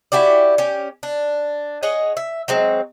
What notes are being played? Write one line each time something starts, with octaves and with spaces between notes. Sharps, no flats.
E4 F#4 G4 D5
C#4 G4
D4
G#4 C#5 D#5 F#5
E5
F#3 G#3 C4